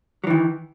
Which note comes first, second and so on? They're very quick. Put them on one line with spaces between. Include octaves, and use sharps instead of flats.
F#3 E3 D#3